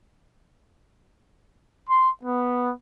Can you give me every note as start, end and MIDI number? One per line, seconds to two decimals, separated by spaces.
1.87 2.10 84
2.22 2.70 59